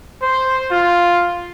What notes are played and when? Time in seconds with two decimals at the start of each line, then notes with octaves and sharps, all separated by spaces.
0.22 C5
0.71 F4